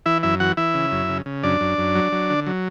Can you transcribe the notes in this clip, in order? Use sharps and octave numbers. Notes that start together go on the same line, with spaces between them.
E3 E4 E5
F#2 E4 E5
E3 F#4 F#5
E3 E4 E5
C#3
F#2
C#3
C#3
F#2 D4 D5
F#2
F#2
F#3
F#3
D3
F#3